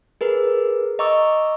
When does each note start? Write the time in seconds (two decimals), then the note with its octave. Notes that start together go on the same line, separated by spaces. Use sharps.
0.21 G#4 A#4 B4
0.99 D#5 A#5 C#6 D6 E6